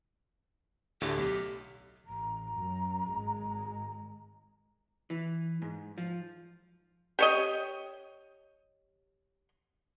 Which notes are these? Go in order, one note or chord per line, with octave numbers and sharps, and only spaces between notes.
D2 A2 D3 G4
B1
A1 A#5
F#2
G#1 G#3
E3
G#2
F3
G4 C#5 D#5